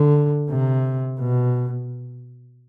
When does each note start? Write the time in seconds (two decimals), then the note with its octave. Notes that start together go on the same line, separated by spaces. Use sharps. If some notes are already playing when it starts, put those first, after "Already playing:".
Already playing: D3
0.50 C3
1.19 B2